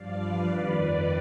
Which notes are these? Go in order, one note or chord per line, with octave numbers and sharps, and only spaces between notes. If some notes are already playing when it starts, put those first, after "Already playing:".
Already playing: G2 F3 D5 F5
B4 D5
F2 D#3 B4 D5